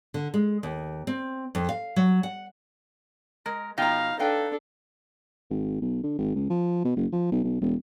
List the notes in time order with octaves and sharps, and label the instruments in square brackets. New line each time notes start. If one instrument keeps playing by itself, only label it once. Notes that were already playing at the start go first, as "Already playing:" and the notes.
[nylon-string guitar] D3
G#3
D#2
C4
F2
F5
F#3
F#5
[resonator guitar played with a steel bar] G#3 [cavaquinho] A#4
[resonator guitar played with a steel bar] B2 F3 G5 [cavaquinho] D#4 A#5 [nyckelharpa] F5
[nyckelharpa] D4 A4 [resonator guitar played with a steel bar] B4 F5 G5
[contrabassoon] G#1
B1
D3
G#1
C#2
F3
B2
F#1
F3
B1
B1
E1